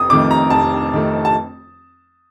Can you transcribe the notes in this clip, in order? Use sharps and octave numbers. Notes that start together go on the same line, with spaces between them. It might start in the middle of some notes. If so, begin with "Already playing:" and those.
Already playing: F1 D#6
F2 D#3 A3 D6
A#5
F1 A5
F2 D#3 A3
A5